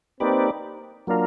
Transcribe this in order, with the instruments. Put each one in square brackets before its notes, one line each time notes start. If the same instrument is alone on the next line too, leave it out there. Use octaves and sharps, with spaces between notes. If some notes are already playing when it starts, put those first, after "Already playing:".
[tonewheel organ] A#3 D#4 G4 B4 D5 [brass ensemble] C4
[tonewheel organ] F#3 A#3 D4 F4 A#4